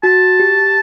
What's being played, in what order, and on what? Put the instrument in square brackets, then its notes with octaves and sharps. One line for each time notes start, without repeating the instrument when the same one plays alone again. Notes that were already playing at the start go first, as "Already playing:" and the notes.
[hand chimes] F#4 [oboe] A5
[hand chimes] G4